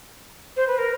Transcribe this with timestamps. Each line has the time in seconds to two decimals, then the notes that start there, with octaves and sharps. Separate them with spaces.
0.57 C5
0.67 B4
0.78 A#4